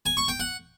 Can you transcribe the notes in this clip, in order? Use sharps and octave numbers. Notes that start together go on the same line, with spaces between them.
G#5
C#6
G5
F#5